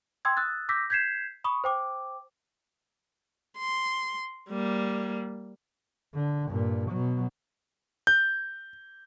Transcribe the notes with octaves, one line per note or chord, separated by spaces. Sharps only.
G5 C6 D#6 E6 G#6
D#6 E6 F#6 A6
D6 E6 G6 A#6 B6
G6 G#6 B6 C7 E7
B5 C#6 D#6
C5 G5 D6
C6
G3 A#3
D3
G2 A#2
B2 F#3
G6